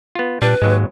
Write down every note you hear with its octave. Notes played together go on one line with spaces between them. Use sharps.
B3 F4
A#2 G3 D4 B4
D#2 G#2 F#3 G#3